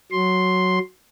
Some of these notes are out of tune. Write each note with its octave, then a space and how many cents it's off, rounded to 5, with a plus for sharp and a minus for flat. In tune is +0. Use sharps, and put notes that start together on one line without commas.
F#3 +0 C6 +5